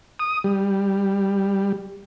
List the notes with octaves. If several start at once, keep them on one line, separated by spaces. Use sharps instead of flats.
D#6
G3